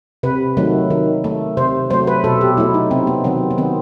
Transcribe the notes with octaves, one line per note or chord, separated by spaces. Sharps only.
C3 B4
D#3 F#3 A3
D#3
A3
C3 C5
F#3 A3 C5
B4
B2 A4
G4
F#3 A3 E4
D#4
C3 C4
B3
D#3 F#3 C4
B3
D#3 C4